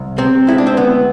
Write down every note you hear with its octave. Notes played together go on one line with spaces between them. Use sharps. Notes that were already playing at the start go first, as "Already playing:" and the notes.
Already playing: C2
C3 C4
G#3 E4
D4
C4
D2 B3